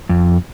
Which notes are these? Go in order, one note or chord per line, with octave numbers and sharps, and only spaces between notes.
F2